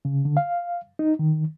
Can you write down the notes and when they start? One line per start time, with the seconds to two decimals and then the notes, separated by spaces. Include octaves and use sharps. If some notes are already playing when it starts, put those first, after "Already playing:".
0.05 C#3
0.25 D3
0.37 F5
0.99 D#4
1.19 D#3